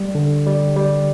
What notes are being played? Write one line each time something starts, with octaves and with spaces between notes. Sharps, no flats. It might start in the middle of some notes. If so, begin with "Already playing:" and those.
Already playing: G3
D3
G3
G3